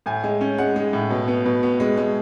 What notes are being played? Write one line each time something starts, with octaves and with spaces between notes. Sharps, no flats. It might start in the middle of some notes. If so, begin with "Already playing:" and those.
A2 G#5
G#3
C#4
G#3 F#5
G#3
A2
B2
B3
B2
B3
G#3
G#3